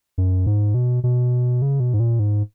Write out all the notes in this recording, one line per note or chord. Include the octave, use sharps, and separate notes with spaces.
F#2
G#2
B2
B2
C#3
B2
G#2
A#2
G#2